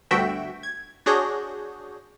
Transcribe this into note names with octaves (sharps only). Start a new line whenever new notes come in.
G1 D2 F#4 E5 G5
G#6
D4 F#4 G#4 C#5 G6 A#6